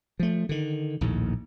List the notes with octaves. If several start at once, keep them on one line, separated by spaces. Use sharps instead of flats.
F3 A3
D3 D#3
A#1 D#2 A2